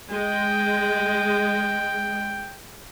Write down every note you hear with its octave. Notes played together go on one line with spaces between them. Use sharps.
G#3 G5